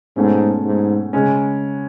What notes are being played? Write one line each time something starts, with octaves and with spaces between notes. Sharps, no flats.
G#2 B2 A3 C#4
G#2
C#3 G#3 C#4